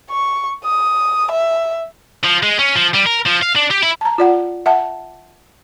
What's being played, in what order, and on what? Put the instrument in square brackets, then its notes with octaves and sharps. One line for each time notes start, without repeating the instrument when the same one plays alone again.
[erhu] C#6
D#6
E5
[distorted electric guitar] F3
G#3
C#4
F3
G3
A#4
F3
F5
D4
G4
E4
[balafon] A5 A#5
F4 D5 F#5
E5 F#5 A5